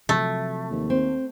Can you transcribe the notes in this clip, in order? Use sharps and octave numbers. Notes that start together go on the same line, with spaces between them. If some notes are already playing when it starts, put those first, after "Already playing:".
C3 F3 F#3 A3
D#2
C4